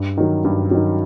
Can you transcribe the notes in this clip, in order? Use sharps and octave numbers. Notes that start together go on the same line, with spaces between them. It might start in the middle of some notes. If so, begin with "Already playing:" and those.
Already playing: G2
D#3 F#3
G2
D#3 F#3